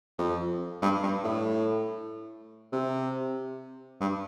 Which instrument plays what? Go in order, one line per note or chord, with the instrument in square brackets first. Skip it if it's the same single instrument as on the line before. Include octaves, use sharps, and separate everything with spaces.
[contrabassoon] F2
G2
G2
A2
C3
G2